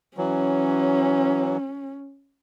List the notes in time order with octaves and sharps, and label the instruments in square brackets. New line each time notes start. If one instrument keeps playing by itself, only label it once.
[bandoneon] E3 F#3 [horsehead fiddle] C#4